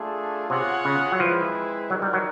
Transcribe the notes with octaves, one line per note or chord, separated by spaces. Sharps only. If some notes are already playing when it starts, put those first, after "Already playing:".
Already playing: A3 D4 F4 G#4
C3 F4 G#4 C#5 F#5
C#3
F#3
F3 G#3 C4 E4 G#4 B4
F#3 D#4 F#4 A#4 D5
G3
F#3